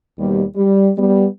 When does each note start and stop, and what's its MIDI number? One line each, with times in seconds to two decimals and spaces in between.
0.18 0.43 39
0.18 0.43 47
0.18 0.43 55
0.55 0.89 55
0.97 1.26 55
0.97 1.26 59